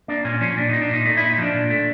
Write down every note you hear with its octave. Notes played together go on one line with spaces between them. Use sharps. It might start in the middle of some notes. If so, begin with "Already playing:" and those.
A#3 D4
A#2 C#4
F3 C#4
A#2 D4
A#3 D#4
D4
A#2 D#4
A3 D#4
A#2 E4
D#4
F3 D4
A#2
A3